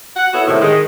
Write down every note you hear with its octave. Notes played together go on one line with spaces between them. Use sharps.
F#5
B3 E4 F#4 A4 C#5
A2 C3 D#3 A3 E4
D#3 G#3